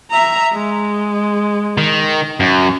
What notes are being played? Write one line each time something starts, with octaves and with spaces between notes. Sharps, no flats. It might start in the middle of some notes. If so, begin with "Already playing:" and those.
E5 A#5
G#3
D#3
F#2